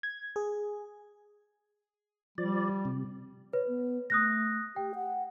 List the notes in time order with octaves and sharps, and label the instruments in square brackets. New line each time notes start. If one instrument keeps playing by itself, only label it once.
[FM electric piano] G#6
G#4
[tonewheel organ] F3 D5 [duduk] G3
[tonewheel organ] C3
[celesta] B4 [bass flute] C#5
[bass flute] B3
[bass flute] A3 [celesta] D#6 F#6 A#6
[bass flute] G4 [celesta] G5
[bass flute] F#5